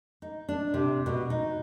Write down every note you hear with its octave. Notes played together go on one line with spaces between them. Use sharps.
D#4
D4
C3
B2
D#4